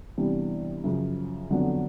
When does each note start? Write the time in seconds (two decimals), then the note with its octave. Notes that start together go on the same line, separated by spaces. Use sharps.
0.17 C3 E3 G3 B3 D4
0.84 F#2 C#3 F3
1.50 F2 D3 F#3 B3 D4